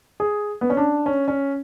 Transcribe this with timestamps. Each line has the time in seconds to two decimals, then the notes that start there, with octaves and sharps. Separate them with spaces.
0.20 G#4
0.61 B3
0.70 C#4
0.77 D4
1.06 C#4
1.28 C#4